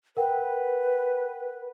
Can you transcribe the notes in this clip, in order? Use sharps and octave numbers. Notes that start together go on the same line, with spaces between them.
A#4 B4 F#5 G5